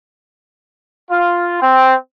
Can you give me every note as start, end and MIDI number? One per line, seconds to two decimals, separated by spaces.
1.10 1.60 65
1.61 1.94 60